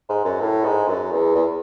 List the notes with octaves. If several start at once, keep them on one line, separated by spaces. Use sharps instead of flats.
G#2
F#2
A2
G#2
F#2
E2
E2